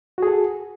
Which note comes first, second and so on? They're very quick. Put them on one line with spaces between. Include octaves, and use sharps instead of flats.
F#4 G#4 A4